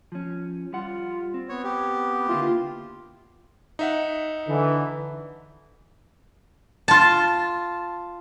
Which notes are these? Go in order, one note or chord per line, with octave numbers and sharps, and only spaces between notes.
F3 C#4
G3 F4 F#5
C4
B3 C#5
G4
D3 A#3 E4 F4
D#4 E5 F#5
D3 E3
F4 A5